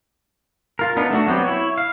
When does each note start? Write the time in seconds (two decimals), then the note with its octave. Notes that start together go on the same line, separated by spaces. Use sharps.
0.79 F4 A#4
0.97 B3 D4 D#4 A#4
1.11 A3 D4 F#4
1.27 F#3 B3 C4 G4
1.44 E4 C#5
1.78 F5